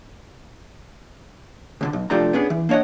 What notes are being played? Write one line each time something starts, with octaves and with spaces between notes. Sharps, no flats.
C#2 B2 D3
B1
C2 F3 A3 D4 G4 A#5
B3 C#4 D4 G#4
E3
A#3 D4 C#5 D#5 F#5